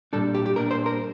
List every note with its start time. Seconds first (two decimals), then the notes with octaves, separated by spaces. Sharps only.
0.13 A#2 G3 D4 A4
0.35 G4
0.46 G4
0.56 A#2 G3 D4 A#4
0.71 C5
0.86 A#4